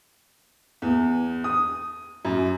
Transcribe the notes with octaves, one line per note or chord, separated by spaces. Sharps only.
E2
D#6
F#2